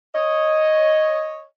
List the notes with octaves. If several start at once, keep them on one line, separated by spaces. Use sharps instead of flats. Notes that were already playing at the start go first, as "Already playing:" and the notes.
C#5 D#5